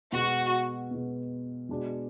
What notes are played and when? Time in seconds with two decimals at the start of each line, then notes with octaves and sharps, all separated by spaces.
0.12 B2 G#3 B3 F#4
0.91 B2 G#3 B3
1.69 B2 G#3 D4 F#4